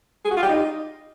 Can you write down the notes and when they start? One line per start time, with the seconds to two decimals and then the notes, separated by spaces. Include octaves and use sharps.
0.25 G#4
0.31 F#4
0.37 F4
0.43 G4
0.48 D#4